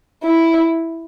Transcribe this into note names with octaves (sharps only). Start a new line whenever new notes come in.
E4